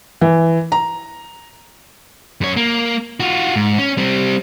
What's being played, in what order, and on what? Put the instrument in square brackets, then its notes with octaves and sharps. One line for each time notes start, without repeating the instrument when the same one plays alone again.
[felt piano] E3
A#5
[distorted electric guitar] F#2 C#5
A#3
F4 F#4
G#2
C#4
G3 C4